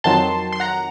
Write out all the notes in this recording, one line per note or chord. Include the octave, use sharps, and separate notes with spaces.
F2 D#3 F#3 A5 C6
C6
F#5 A#5